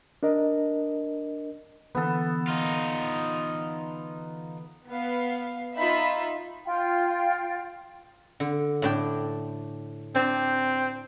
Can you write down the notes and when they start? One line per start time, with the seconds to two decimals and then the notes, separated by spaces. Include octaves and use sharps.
0.23 D4 A#4 D#5
1.95 D3 E3 B3 A4
2.47 D#4 F4
4.87 B3 F5
5.77 D#4 F4 E5 B5
6.65 F4 G5
8.40 D3
8.82 A2 D4 G5
10.15 C4 D4